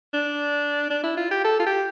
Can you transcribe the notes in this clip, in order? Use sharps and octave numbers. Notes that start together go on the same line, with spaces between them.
D4
D4
E4
F4
G4
A4
F4
G4